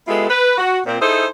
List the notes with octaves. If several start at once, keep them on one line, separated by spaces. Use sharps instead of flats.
G#3 B3 E4 F4 G4 A4
B4
F#4
A#2 C4
D#4 E4 G#4 A4 C5